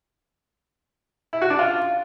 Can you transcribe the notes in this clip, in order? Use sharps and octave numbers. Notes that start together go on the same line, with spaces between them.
E4
F#4
D4
F4